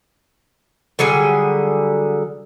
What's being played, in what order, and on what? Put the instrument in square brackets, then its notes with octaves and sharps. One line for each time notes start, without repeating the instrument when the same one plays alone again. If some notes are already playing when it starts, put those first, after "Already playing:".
[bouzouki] D3 F#3 G3 G#4